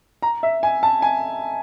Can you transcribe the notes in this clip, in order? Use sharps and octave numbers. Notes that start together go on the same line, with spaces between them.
A#5
E5
G#5
A5
G#5